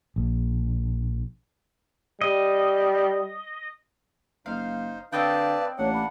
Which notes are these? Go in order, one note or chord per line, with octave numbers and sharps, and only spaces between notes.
A#1
G3 D#5
F#1 D#4 C5 F5
D3 C4 B4 D5 D#5 F5 G5 A5
A1 A#3 D4 C#5 F#5
B5